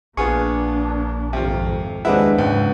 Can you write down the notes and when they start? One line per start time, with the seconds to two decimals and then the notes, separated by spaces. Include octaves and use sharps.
0.17 A#1 A#3 B3 D4 F4 G#4 C#6
1.33 G#1 F2 C3 F4
2.05 D#2 G#3 C4 D4 E4 B4 F#5
2.39 C#2 G#2 C#3 F#3